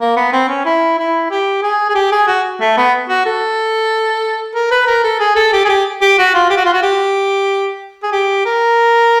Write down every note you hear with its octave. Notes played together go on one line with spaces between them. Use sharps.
A#3
B3
C4
C#4
E4
E4
G4
G#4
G#4
G4
G#4
F#4
A3
B3
F#4
A4
A#4
B4
A#4
A4
G#4
A4
G4
G#4
G4
G4
F#4
F4
G4
F#4
F4
F#4
G4
G#4
G4
A#4